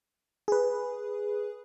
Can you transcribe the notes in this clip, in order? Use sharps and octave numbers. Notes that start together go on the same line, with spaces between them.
G#4 B4